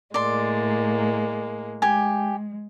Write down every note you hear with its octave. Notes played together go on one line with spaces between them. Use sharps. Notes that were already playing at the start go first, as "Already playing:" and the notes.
A2 G#3 A#3 D5 C6
G#3 G4 G#5